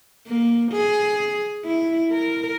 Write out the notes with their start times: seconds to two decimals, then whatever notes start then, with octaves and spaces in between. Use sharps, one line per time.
0.27 A#3
0.72 G#4
1.65 E4
2.12 A#4